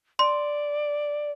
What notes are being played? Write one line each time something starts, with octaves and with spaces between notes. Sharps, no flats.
D5 C6